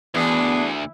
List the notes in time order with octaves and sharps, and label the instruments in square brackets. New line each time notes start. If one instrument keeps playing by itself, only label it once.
[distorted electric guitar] D2 [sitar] E3 [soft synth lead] B3 [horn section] D4 G#4 B4